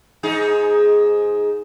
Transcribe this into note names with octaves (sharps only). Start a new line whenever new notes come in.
G#2 D#4 G#4